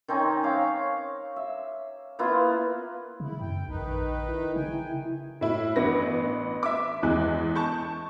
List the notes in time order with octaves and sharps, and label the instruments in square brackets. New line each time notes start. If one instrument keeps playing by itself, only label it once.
[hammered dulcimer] D#3 C4 C#4 D#4
C#5 F5 D6
E5
A#3 B3 E4 F4
[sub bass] C#3 [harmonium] E4
[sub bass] F#2 [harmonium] G5
[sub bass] A#1 [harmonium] D#3 D#4 B4
[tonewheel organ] E4
[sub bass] C#3 [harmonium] G5 G#5
[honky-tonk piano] A2 E4
A1 B3 D4 B4 A#6
E5 D6
E2 E3 G#3 F#6
A5 C#6 G6